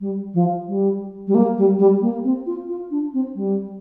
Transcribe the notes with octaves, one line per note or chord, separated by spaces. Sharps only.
G3
F3
G3
G3
A#3
G3
G3
A#3
C4
F4
F4
D4
C4
G3